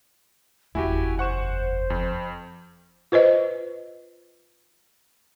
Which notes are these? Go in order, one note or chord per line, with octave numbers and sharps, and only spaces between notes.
F#1 E2 E4 F#4 G4 G#5
C5 F#5 C#6 E7
F2
F4 B4 C5 D#5